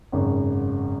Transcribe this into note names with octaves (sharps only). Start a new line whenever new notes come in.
G#1 F#2 C#3